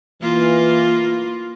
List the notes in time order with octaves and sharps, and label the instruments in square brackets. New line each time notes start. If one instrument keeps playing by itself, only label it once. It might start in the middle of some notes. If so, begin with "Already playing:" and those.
[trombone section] E3 [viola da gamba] A#3 F4